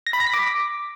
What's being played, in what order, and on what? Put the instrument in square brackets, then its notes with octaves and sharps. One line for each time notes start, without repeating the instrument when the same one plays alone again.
[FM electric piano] A#6
B5
A#6
B6
D6